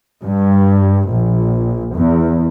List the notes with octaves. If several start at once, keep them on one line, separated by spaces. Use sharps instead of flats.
G2
A#1
E2